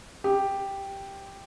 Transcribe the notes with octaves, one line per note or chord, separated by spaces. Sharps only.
G4